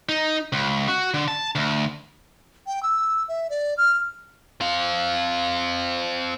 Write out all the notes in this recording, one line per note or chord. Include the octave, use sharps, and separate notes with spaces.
D#4
C#2
F#4
D3
A5
D2
G5
E6
E5
D5
F6
C4 F5